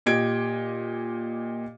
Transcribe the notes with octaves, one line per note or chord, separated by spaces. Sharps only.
A#2 G4 D#5 G#6 D7